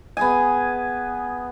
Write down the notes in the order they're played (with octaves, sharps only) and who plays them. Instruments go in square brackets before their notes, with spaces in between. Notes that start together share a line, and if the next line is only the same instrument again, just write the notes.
[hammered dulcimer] B3 G#4 G#5